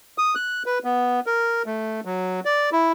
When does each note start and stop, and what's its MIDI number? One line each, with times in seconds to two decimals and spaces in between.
0.18 0.35 87
0.35 0.63 90
0.66 0.79 71
0.84 1.20 59
1.26 1.62 70
1.66 2.00 57
2.05 2.40 54
2.45 2.70 74
2.72 2.92 64